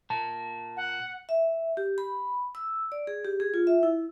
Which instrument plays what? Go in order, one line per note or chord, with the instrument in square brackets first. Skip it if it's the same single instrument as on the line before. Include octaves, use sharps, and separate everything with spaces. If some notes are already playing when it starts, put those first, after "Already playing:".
[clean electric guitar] A#2 A#3 [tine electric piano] A5
[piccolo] F#5
[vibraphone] E5
G4
B5
E6
D5
G#4
G4
G#4
F4
E5
E4